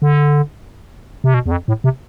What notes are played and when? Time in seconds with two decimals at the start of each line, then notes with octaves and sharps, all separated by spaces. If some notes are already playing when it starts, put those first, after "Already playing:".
0.02 D3
1.24 C3
1.34 B2
1.46 E2
1.51 F2
1.68 A2
1.84 C3